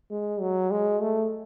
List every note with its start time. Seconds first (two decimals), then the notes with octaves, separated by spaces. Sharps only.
0.11 G#3
0.41 F#3
0.71 G#3
1.01 A3